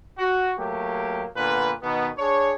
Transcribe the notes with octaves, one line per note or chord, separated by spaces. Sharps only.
F#4
F#3 A3 A#3 G4
A#2 D3 B3 B4
B2 D#3 B3
D4 G#4 C#5